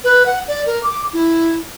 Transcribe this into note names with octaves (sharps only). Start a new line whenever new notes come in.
B4
F#5
D5
A#4
D6
E4